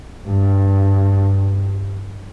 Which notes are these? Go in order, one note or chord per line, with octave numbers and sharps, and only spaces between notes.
G2